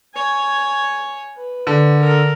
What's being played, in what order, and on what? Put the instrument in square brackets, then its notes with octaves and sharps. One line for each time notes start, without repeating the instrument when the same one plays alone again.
[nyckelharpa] C#5 G#5
B4
[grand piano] D3
[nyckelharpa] A4 A#4